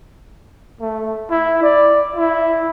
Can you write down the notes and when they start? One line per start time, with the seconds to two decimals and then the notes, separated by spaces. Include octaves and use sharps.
0.80 A3
1.30 E4
1.62 D5
2.16 E4